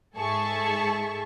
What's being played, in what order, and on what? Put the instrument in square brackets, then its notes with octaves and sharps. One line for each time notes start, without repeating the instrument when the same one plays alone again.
[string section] G#2 G#4 A4 E5 A5 C#6